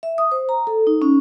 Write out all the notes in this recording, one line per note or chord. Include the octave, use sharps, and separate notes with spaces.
E5
D#6
C5
A#5
A4
D#4
C#4